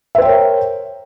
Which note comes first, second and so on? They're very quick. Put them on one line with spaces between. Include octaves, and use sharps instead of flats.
E5 C5 G5 C#5 A#4